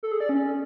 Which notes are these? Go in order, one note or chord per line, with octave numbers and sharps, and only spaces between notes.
A4
G#4
D5
C#4